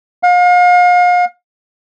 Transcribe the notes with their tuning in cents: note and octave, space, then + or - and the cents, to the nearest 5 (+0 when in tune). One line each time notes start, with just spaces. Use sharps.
F5 +40